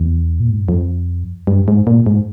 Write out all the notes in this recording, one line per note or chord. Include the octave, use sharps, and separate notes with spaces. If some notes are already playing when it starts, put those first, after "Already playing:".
Already playing: E2
A#2
G#2
G2
F2
G2
G#2
A#2
G#2